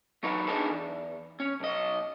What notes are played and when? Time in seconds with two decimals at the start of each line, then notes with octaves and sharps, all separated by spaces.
0.23 E2 F#3 D#4 F#4 B4
0.47 D4 D#4 G#4 A4 B4
0.71 E2
1.40 C#4
1.60 B1 D#5